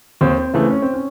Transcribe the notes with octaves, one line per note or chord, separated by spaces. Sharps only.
D#2 C4
C4
C#3 E3 A3 C4
C#4
C4
C#4